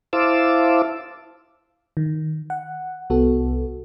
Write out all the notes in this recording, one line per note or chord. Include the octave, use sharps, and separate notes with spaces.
E4 C5 F5 A5 D6 E6
D#3
F#5
C2 B3 F#4 A4